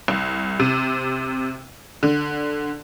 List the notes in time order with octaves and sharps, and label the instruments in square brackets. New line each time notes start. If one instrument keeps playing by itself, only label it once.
[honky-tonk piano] C2
C3
D3